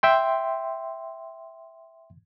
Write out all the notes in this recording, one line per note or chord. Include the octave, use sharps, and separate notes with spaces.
E5 G5 C6